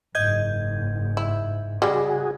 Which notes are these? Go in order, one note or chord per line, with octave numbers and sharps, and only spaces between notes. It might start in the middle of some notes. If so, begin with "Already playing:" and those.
F#1 G#2 D#5 G6 G#6
E4
C#3 G3 G#3 F#4 G#4